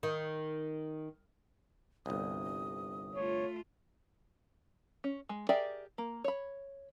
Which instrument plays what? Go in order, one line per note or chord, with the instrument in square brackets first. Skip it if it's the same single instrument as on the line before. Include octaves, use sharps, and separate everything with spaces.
[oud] D#3
[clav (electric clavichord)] G1 C2 [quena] D#6
[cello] A3 F4 [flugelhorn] C#5
[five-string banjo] C#4
G#3
G4 G#4 A#4 D5 E5
A#3
C#5 B5